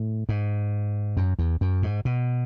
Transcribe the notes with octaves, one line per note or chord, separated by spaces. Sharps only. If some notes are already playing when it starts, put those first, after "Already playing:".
Already playing: A2
G#2
F#2
E2
F#2
G#2
B2